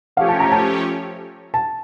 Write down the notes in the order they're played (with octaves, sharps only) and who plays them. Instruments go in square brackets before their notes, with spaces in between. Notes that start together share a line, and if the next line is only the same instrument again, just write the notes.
[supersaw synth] F3 A3 C#4 G4 C#5 [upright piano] F5
[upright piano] A5
A#5
A5
A5